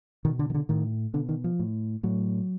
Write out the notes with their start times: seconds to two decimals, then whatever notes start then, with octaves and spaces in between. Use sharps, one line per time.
0.25 B2 D#3
0.39 D3
0.50 D#3
0.54 D3
0.69 A2 D#3
1.14 B2 D3
1.29 D#3
1.44 F3
1.59 A2
2.03 A2 F#3